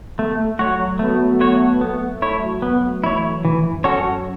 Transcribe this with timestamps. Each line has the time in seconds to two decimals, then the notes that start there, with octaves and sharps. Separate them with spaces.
0.18 A3 B3
0.38 A3
0.59 F#3 F#4 C#5
0.80 F#3
0.99 A3 B3
1.27 A3
1.41 F#4 C#5
1.54 A3
1.81 A3 B3
2.08 A3
2.22 E4 C#5
2.35 F#3
2.62 A3 B3
3.04 E3 E4 C#5
3.44 A2 E3
3.71 F#2
3.84 C#4 F#4 A4 C#5
3.98 F#2